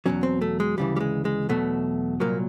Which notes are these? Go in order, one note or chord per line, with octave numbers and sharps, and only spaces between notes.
E2 B2 F#3 C#4
C4
A3
G#3
D2 C#3 E3 G3
G3
G#3
G#3
E2 B2 F#3 A3
C2 A#2 F#3 A#3